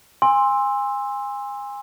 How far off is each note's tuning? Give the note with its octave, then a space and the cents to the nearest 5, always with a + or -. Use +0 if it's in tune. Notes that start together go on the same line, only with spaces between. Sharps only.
G#5 -30 C6 +10 E6 +0